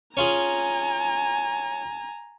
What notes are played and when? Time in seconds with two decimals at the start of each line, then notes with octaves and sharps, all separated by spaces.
0.17 C#4 F4 G#4 G#5 A#5